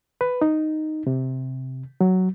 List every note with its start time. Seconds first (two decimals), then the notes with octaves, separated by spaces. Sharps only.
0.21 B4
0.42 D#4
1.07 C3
2.01 F#3